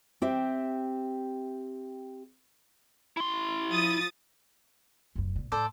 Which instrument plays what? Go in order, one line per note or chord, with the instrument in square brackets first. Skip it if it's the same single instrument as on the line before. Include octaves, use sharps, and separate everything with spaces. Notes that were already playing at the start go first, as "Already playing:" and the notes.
[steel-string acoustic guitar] C4 G4 E5
[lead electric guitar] E4 C6
[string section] F3 D#6 A6
[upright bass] F1 F#2
A#1 A#2
[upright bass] A2 [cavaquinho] A4 C5 D5